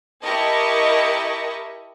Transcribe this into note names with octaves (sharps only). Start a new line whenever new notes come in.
E4 G4 A#4 D#5 A5 C#6